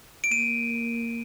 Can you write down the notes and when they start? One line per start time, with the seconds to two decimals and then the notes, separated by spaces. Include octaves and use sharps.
0.24 D7
0.31 A#3 D#7